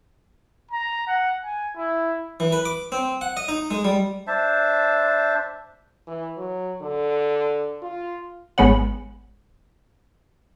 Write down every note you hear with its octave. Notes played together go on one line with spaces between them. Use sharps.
A#5
F#5
G#5
E4
E3
B4
D6
C4
F#5
D#5
D#4
G#3
G3
D4 C5 E5 A5
E3
F#3
D3
F4
G#1 G#3 B3 C#5 F#5